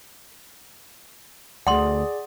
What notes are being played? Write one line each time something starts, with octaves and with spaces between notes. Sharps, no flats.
D2 G#4 D5 F#5 C6